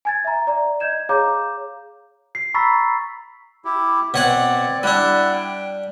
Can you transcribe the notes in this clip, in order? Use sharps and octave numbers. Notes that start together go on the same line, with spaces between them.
G#5 G#6 A6
E5 A#5
D5 A#5
D#5 G6 G#6 E7
G#4 C#5 F5 A#5 D6 G6
C7
A#5 B5 C#6 E6 A6 B6
E4 G4
B2 C4 C#5 D5 F#5
G3 D4 E4 D5 F#5
G5